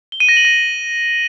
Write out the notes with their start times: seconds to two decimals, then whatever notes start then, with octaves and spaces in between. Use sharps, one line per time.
0.12 G7
0.20 D#7
0.29 A#6
0.37 F#7
0.45 A#6